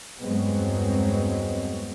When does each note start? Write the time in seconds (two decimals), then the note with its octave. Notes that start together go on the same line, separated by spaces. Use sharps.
0.20 E2 G2 F#3 G#3 B3 C4